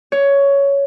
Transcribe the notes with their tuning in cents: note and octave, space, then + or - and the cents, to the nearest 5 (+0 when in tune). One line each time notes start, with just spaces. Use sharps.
C#5 +10